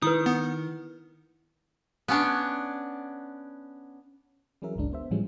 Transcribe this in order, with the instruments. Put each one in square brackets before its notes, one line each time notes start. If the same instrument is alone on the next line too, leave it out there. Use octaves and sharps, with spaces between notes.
[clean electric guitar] D#3 [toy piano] E4 B4 [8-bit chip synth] D#6
[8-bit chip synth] B3
[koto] B3 C#4 D4
[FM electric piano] E3 F#3 C#4 G#4 A#4 E5
G1 C#2 G#3 D4
B3 C5 E5
A2 E3 F3 G3 G#3 C#4